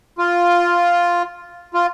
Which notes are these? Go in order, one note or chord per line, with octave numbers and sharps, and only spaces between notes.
F4
F4